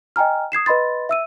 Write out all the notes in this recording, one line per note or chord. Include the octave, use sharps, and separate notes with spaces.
D#5 G5 G#5 A#5 F6
D#6 G#6 C7 E7
B4 D#5 B5 C6 A6
E5 E6 D#7